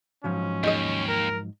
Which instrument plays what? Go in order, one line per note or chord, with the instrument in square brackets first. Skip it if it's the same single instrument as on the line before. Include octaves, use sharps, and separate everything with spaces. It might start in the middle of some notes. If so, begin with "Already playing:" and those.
[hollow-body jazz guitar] G#2 F3 F#3 [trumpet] C#4
[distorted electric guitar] D#2 [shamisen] D#4 G#4 D#5
[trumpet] A#4